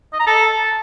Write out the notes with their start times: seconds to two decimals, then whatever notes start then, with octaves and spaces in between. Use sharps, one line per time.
0.13 D#5
0.20 A#5
0.27 A4